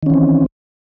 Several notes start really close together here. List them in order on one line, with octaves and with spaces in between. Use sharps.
D#3 C#4 E3 C4